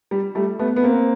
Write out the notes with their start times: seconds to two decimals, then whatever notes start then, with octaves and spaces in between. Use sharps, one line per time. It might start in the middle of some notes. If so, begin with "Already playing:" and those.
0.11 G3
0.35 G3 A3
0.59 A3 B3
0.76 B3
0.83 A#3 C4